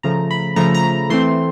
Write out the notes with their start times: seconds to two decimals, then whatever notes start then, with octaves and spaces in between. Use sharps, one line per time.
0.03 C#3 F3 A3 A#5
0.31 B5
0.56 C#3 F3 A3 A#5
0.75 A#5
1.10 E3 A3 C4 C6